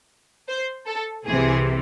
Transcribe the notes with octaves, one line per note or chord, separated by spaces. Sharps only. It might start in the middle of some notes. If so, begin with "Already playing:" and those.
C5
A4
C2 C3 E3 G#4